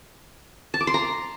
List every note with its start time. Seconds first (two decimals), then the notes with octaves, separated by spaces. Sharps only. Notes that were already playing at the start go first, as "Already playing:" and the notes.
0.74 A5
0.81 D6
0.87 C6
0.94 A#5